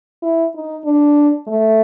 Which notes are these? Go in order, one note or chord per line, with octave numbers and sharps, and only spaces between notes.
E4
D#4
D4
A3